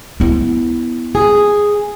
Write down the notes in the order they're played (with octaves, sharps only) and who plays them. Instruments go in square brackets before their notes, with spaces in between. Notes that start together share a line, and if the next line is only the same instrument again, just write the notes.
[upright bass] B3 E4
[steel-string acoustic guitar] G#4